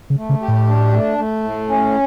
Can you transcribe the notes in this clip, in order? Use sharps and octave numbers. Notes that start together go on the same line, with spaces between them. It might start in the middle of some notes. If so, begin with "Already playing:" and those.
C#3
A3
C#3
G4
A2
D4
A3
A3
A2
C#4